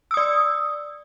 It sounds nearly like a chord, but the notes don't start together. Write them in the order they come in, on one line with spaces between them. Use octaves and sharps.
E6 D#6 D5